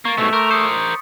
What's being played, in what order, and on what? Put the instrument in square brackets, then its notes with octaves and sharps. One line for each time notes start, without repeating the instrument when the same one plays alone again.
[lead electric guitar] A#3 [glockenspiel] C#6 A6
[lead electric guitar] G#2 B2 [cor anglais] A3 [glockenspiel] B6
[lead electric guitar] A#4 [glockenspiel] C6 D6 G6
[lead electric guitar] A#4 C5 [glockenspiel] D#6 C#7